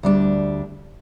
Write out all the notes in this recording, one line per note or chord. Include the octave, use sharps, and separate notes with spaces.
D2 G3 D4